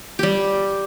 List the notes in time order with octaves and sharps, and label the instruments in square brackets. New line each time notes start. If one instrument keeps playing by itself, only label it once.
[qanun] G3 G4